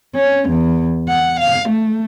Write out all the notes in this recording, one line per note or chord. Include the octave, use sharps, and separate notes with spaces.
C#4
E2
F#5
F5
A3